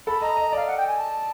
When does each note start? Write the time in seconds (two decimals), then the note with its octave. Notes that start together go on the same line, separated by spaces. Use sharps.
0.07 A4 B5
0.21 D#5 A#5
0.37 D#5
0.53 D5 F5
0.67 F#5
0.77 G5
0.87 G#5
0.97 A5